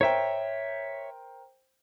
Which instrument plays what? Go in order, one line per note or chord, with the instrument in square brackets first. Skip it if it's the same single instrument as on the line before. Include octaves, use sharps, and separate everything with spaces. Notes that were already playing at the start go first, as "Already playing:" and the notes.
[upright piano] A#4 C5 G5 [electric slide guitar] C#5 E5